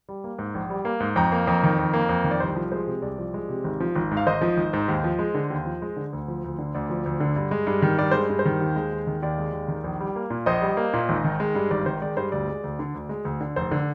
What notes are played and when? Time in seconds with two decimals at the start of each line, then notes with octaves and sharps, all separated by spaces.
0.09 G3
0.24 A#3
0.39 G#2
0.54 A#1
0.70 G3
0.85 A#3
1.00 G#2
1.16 F2 G5 A#5
1.32 A#3
1.47 F2
1.64 D#3
1.79 F2
1.93 A#3
2.09 F2
2.24 D#3
2.31 D5
2.40 C2 C5
2.55 F3
2.72 G#3 C5
2.87 C3
3.02 C2 D5
3.18 F3
3.34 G#3
3.49 C3
3.64 G#1
3.80 F3
3.96 G#1
4.11 G#2
4.17 F5
4.27 G#1 C5 D#5
4.41 F3
4.57 G#1
4.73 G#2
4.88 D#2
5.04 F3
5.19 G#3
5.34 D3
5.50 D#2
5.66 F3
5.82 G#3
5.96 D3
6.13 D2
6.28 F3
6.44 D2
6.58 D3
6.75 D2 D5
6.90 F3
7.06 D2
7.20 D3
7.36 G2
7.51 G#3
7.67 G2
7.82 D#3
7.98 G2 D5
8.11 G#3 C5
8.29 G2
8.39 C5
8.45 D#3
8.61 D#2
8.76 G#3
8.92 D#2
9.07 D#3
9.23 D#2 D5
9.38 G#3
9.53 D#2
9.68 D#3
9.84 A#1
10.00 G3
10.16 A#3
10.30 A#2
10.46 A#1 C5 D#5
10.62 G3
10.77 A#3
10.93 A#2
11.09 G#1
11.24 D#3
11.40 G#3
11.55 G2
11.71 G#1 D5
11.86 D#3 C5
12.02 G#3 D5
12.17 G2 C5
12.32 D2 D5
12.48 G#3
12.64 D2
12.79 D3
12.94 D2
13.09 G#3
13.25 D2
13.41 D3
13.56 F1 C5
13.71 D3